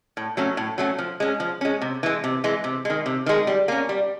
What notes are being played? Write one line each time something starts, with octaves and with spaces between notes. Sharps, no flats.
A2
F#3 A3 C#4
A2
F#3 A3 C#4
F3
G#3 C#4
F3
G#3 C#4
C3
E3 G#3
C3
E3 G#3
C3
D#3 G#3
C3
D#3 G#3
G3
A#3 C#4
G3